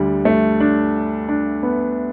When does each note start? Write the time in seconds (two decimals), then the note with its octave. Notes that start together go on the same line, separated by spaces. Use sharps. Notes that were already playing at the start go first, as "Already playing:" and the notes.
Already playing: D2 D3 G3
0.25 A3
0.60 D4
1.29 D4
1.63 B3